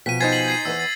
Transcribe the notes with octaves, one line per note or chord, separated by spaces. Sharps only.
B2 F3 G5 B6 D#7
D#4 C5 G#5 G#6 A6 C7
B6 C7 F#7
G#6 C7 D#7
E2 E3 B3 E6
A6